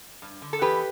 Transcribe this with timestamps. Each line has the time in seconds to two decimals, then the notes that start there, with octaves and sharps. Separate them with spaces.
0.22 G2
0.42 D3
0.53 A4
0.61 E2 G4 B4